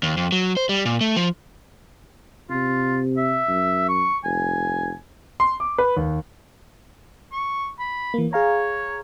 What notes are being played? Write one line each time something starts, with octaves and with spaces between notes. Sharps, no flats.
D#2
F2
F#3
C5
G3
A#2
A3
F3
C3 F4
E5
F#2
C#6
F1 G#5
C6
D6
B4
D#2
C#6
B5
E3 A#3
G#4 C#5 F5 A#5